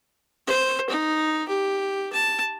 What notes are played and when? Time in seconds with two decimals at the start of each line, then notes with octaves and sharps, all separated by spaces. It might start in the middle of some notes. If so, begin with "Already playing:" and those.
0.47 C5
0.90 D#4
1.48 G4
2.13 A5